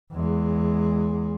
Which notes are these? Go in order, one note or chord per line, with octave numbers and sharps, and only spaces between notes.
E2 G#3